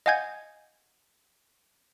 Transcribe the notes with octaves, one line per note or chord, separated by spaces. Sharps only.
D#5 F5 F#5 G#5 G6 G#6